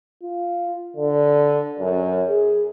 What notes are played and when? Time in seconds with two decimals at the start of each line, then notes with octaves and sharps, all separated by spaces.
0.23 F4
0.96 D3
1.79 F#2
2.29 G#4